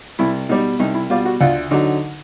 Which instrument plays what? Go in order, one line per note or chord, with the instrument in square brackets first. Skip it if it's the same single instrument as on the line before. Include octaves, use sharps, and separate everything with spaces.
[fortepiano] C2 E4
B2 G3 D#4
C2 D#4
E4
B2 G3 F4
F#4
D2 F4
D3 F#3 D#4